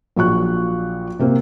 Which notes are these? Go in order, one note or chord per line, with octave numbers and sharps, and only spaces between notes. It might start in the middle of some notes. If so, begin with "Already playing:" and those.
A#1 A#2 F#3 C#6 F#6
C3 A#3 C4